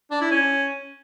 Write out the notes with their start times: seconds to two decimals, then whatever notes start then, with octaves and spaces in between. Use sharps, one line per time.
0.11 D4
0.21 E4
0.31 C#4